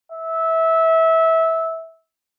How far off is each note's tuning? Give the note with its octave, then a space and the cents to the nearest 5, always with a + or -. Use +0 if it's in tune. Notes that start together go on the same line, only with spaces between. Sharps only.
E5 -20